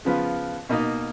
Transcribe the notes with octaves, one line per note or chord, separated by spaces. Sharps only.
C#3 F3 B3 F4 B4
B2 A#3 D#4